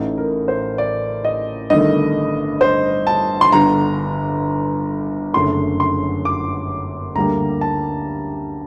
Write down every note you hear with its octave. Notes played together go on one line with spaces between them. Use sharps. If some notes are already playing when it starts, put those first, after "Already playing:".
Already playing: A1 A2 A3 D#4
A#4
C5
D5
D#5
G1 G2 D#3 A3 D#5
C5
A5
C6
G1 G2 D3 A#5
F#1 F#2 D3 A3 C6
C6
D6
D2 D3 G3 A#3 A#5
A5